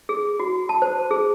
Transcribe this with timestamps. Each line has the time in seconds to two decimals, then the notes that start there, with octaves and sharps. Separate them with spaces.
0.09 G#4
0.40 F#4
0.69 A5
0.82 C5
1.11 G#4